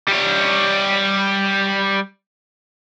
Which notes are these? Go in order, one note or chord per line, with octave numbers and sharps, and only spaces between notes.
G3 C#5